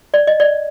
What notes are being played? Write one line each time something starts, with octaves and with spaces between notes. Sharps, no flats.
D5
D#5
D5